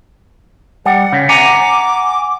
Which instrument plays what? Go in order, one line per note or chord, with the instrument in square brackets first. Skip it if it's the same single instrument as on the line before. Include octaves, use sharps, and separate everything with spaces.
[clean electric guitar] G3 [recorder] F#5
[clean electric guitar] C#3
[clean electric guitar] F#5 G#5 A#5 [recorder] D6